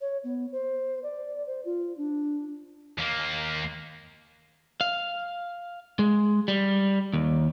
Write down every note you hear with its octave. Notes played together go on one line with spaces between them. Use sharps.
C#5
B3
C5
D5
C5
F4
D4
D#2 A#3
F5
G#3
G3
D#2